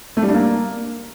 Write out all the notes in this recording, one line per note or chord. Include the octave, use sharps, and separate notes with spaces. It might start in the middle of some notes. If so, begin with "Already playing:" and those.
A3
G3
D4
A#3